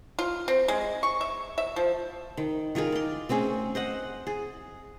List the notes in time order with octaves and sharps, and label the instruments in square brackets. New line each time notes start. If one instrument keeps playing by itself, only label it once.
[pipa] F4
C4
G#3
C#6
E5
E5
F3
[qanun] D#3
D#3 F4 G#4 A#4
D5 C6
A3 C4 C#4 G#4
C5 D#5 F#5
G#4